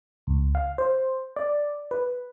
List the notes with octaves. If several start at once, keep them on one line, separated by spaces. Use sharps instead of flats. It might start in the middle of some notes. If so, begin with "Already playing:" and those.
C#2
F5
C5
D5
B4